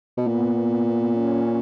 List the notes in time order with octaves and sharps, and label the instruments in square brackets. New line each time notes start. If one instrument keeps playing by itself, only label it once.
[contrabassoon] B2
[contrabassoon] A#2 [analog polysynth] B3
[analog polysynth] C#4
C#4